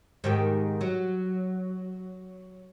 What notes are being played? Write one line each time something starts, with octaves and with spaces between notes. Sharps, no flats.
G#2 D#3 G4
F#3